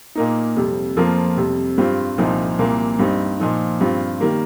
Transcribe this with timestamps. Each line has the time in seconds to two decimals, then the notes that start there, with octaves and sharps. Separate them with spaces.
0.15 A#2 A#3 D#4
0.56 F2 C3 G3
0.97 F2 F3 A#3 F4
1.37 F2 C3 G3
1.78 G2 G3 C4 F4
2.18 C2 A#2 F3 C4 D#4
2.59 C2 A#2 A#3
2.99 G2 G3 C4 D#4
3.40 A#2 F3 D#4
3.81 G2 G3 C4 F4
4.20 D#3 G3 A#3